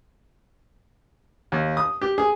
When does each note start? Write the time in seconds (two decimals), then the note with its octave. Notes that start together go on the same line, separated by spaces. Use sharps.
1.52 D#2
1.77 D#6
2.02 G4
2.18 G#4